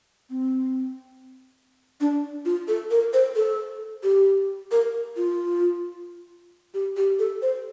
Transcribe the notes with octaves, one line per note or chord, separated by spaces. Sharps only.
C4
D4
F4
A4
A#4
C5
A4
G4
A#4
F4
G4
G4
A4
C5